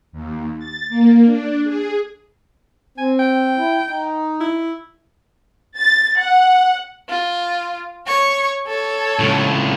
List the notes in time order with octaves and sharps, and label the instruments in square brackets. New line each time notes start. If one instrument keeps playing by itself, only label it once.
[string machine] D#2
A6
A#3
D4
G#4
[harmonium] C4 [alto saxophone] G#5
[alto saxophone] G5
[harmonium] E4
D#4
[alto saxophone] E4
[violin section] A6
F#5
[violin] F4
C#5 C#6
A4 C#5
[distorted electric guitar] C#2 A2